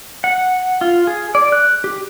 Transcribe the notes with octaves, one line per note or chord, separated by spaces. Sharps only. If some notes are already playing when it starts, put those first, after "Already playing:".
F#5
F4
G#4
D5
F#6
G4